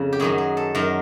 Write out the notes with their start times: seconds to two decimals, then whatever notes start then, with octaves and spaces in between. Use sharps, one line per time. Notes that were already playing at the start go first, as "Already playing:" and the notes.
Already playing: F2 C#3
0.13 G4
0.20 F#2 D#3 F#3 G#4
0.38 G#4
0.57 A4
0.75 F#2 D#3 F#3 A#4